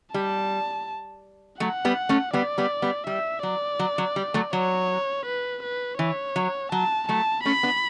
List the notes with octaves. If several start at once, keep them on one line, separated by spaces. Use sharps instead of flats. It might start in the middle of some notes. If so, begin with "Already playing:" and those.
G3 A5
F#3 A3 F#5
G3 B3
A3 C#4
G3 B3 D5
G3 B3
G3 B3
G3 E5
F#3 D5
F#3
F#3
G3
F#3 A3
F#3 C#5
B4
B4
E3 C#5
F#3
F#3 A5
F#3 A3 A5
A3 C#4 B5
B3 D4